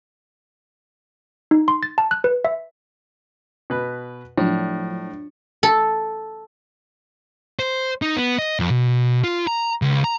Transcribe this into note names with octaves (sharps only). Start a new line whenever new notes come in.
D#4
C6
A6
A5
F#6
B4
E5
B2 B4
A2 F3 F#3 D4
A4
C5
D#4
B3
D#5
F2
B2
F4
A#5
C#2
A#5